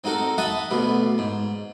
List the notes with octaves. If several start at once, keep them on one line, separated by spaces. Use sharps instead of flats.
C4 D#4 F#4 A4 A#4
D#5 E5 F#5 A5 B5 D#6
D2 B2 B3
G#2